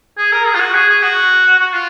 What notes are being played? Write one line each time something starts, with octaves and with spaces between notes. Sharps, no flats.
G#4
A#4
G#4
F4
F#4
G#4
G#4
F#4
F#4
F4